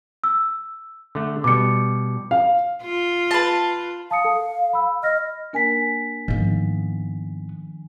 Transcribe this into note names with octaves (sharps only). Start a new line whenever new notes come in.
E6
D3 A3
B2 G3 D6 C#7
F5
F4
B4 A5
F5 A5 D#6 C#7
A4
B5 E6
D#5 F6 A#6
A#3 D4 A#4 G#5 B6
G#2 D#3 F3 B3